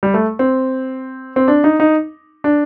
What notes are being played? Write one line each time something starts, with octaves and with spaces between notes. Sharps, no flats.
G3
A3
C4
C4
D4
D#4
D#4
D4